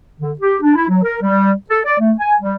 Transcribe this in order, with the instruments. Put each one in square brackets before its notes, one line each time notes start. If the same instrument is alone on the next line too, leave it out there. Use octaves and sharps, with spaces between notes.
[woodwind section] D3
G4
D4
E4
F#3
A#4
G3
A4
D5
A3
G#5
G3